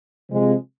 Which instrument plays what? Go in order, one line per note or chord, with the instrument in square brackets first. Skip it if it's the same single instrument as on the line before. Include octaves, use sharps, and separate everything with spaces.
[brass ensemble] C3 F3 G#3